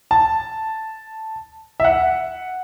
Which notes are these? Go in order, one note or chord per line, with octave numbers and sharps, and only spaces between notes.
A5
E5
F#5